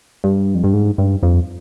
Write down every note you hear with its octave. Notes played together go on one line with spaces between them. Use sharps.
G2
F2
G2
G#2
G2
F2